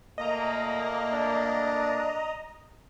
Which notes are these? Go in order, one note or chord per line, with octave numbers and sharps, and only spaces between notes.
A#2 A3 A#3 D#5 A#5
D4